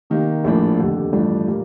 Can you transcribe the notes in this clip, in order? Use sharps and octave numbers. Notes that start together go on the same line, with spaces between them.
C3 D#3 A#3
A#1 A2 F3 A#3 D4
F1 D#2 D3
A1 G2 F3 A3 D4
A#2 G3 A#3